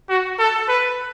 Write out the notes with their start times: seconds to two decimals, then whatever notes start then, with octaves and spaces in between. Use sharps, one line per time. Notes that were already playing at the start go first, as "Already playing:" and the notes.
0.09 F#4
0.39 A4
0.68 B4